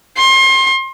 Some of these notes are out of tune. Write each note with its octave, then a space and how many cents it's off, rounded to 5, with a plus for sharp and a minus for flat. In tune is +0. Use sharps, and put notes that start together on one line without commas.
C6 +30